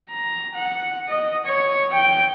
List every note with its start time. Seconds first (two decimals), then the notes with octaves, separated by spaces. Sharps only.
0.11 A#5
0.55 F#5
1.09 D#5
1.46 C#5
1.94 G5